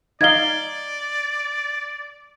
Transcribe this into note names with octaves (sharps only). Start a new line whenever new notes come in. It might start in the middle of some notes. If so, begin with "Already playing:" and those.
D#4 D5 D#5 F5 G#6 G7